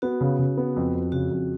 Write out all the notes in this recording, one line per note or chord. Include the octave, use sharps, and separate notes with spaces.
B3 F#4
C#3
C#3
B3
F2
F2
C#3 F#4
F2